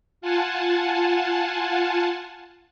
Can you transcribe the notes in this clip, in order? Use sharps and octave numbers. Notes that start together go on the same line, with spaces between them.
F4 F#5 G#5 A5